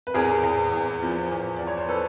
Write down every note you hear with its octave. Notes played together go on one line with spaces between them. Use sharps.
B4
E2 G#4 A#4
E2
E2
F3
E2
E2 D5
C#5
C5
A4 B4